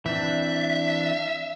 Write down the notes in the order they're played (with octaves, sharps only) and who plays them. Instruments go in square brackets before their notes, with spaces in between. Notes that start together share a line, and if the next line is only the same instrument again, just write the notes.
[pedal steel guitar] E3 C4 D4 [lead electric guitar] E5